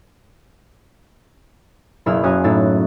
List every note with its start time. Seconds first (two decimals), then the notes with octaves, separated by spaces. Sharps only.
2.06 F#1 B2 E4 G#4 F6 E7
2.23 F#2 C#4 F#4 G#5 D#6
2.44 A2 D#4 E4 A6